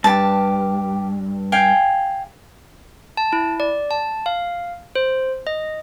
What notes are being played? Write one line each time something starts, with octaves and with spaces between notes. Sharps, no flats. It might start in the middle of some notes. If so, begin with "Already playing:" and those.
G2 G4 A5
F5 G5 G#5
A5
E4
D5
A5
F5
C5
D#5